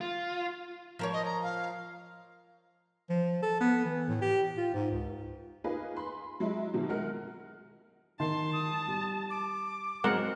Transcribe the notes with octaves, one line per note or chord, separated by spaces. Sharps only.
F4
F3 A#4 C#5
D#5
A#5
F5
F3
A4
B3
E3
A2
G4
F4
G#2
C#2
A#3 D#4 F4 G#4 B4
B5 C6
F#3 G#3 E4
B2 D#3 F#3
G#3 A#4 F#5 F6
D#3 A5 C6
D#6
G3
D6
F#3 G#3 C4 A#4 F#5